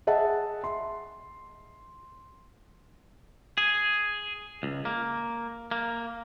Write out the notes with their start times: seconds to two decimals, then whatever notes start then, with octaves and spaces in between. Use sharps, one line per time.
0.07 G#4 D#5 E5 F#5 A5
0.64 C6
3.58 G#4
4.63 C#2
4.85 A#3
5.71 A#3